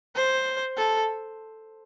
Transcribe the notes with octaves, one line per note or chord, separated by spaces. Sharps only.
C5
A4